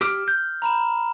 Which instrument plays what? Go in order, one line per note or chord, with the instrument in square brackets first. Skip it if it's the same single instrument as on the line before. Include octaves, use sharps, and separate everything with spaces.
[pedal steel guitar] G4 D6 E6 [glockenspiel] F6
[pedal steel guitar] G6
[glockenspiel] A#5 B5 E7